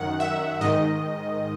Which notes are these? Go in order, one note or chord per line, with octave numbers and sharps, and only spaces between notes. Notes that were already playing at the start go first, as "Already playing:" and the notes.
Already playing: F#2 D#3 F#5
E5
G#2 D#3 D#5